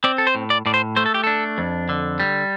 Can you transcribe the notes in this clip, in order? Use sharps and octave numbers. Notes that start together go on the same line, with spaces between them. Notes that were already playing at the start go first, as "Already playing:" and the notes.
C4 D5
A4
C5
A2
D5
A2 D5
C5
A3 C5
A4
G4
D4 A4
F2
D3
G3